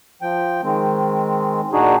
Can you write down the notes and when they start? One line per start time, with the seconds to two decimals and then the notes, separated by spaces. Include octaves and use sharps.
0.22 F3 G5
0.63 D#3 G#3 C4
1.73 A#2 D4 D#4 F#4 G#4